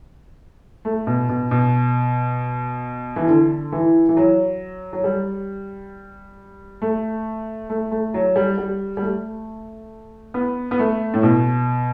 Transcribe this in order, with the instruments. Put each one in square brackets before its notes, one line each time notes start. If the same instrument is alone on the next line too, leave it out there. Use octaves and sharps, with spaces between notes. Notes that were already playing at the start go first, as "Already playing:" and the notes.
[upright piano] A3
B2
B2
B2
E3
D3
E3
E3
F#3
F#3
G3
A3
A3
A3
F#3
G3
G3
G3
A3
B3
B3
A3
A2
B2